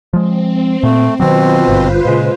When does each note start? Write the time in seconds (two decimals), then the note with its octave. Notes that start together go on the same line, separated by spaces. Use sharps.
0.13 F3 G#3 C4
0.83 A#2 A3
1.20 B2 D#3 F#3 C4 F4 B4 C5
1.68 G#1 G2 D3
2.05 A#2 C#3 G#3